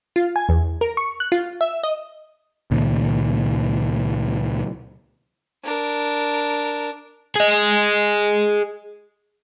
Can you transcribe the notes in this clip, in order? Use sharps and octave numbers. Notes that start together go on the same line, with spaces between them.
F4
G#5
E2
A#4
C#6
F#6
F4
E5
D#5
C#2 A#2 D#3
D4 A#4
G#4 D#5